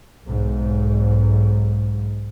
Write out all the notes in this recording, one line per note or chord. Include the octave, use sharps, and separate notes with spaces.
B1 G#2